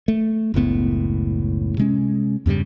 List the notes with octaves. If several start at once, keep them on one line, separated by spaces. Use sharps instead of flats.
A3
F#1 C#2 A2 B3
C3 G#3 C#4
E2 G2 C#3 G3